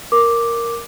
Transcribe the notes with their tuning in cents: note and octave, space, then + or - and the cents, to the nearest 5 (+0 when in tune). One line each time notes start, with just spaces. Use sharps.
A#4 +0 D6 +0